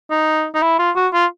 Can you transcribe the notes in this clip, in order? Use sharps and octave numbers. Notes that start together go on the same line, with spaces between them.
D#4
D#4
E4
F4
F#4
F4